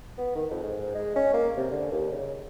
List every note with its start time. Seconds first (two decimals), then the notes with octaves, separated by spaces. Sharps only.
0.18 B3
0.35 D#3
0.51 F2
0.63 G#2
0.95 G#3
1.16 C#4
1.34 A#3
1.57 C3
1.71 D3
1.92 D#2
2.12 C#3